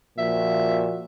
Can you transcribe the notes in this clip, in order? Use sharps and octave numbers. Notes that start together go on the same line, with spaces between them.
A#2 F3 F#4 E5